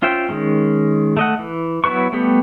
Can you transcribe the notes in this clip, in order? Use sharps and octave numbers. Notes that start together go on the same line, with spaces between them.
C#4 F4 C5 E5 G5
D#3 G#3 C#4
A3 D#5 F#5
E3
F#3 B3 E4 B4 C#6
G3 A3 B3 G4